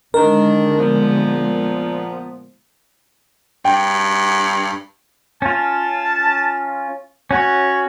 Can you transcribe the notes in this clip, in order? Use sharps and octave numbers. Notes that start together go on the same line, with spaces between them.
D3 D#3 G#3 D4 A#4
A#2 F3 B3
G2 G5
C#4 F4 A5
C#4 F#4 C#5